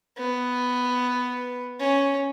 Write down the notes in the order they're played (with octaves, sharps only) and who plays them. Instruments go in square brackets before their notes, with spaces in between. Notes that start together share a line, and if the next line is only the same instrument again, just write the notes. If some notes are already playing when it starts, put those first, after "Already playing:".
[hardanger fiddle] B3
C#4